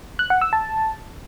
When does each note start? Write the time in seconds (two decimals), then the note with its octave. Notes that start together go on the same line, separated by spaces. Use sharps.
0.19 F#6
0.30 F#5
0.41 E6
0.53 A5